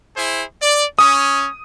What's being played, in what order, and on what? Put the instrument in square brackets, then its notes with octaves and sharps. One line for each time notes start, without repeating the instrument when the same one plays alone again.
[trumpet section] E4 G#4 C5
D5
[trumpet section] C#4 [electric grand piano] D#6